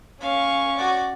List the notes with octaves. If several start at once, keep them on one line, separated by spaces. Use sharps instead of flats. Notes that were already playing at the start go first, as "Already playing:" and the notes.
C#4 F5 C#6
F#4 D5